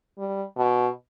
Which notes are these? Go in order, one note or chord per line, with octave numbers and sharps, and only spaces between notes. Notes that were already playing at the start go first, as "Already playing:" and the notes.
G3
B2